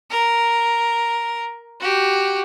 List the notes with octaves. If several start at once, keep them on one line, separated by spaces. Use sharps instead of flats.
A#4
F#4 G4